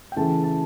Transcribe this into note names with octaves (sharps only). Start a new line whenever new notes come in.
G5
C#3 E3 A3 A5
A5